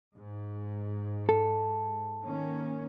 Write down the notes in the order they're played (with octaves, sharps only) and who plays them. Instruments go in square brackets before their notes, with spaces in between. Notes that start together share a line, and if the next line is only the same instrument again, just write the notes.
[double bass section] G#2
[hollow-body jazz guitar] A4
[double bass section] D#3 A#3 C#4